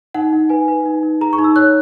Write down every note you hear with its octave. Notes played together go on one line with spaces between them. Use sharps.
D#4 F#5
D#4
B4 G#5
B4
D#4
D#4
G#4 A#5
C#6
D#4
E6
C#5 F#6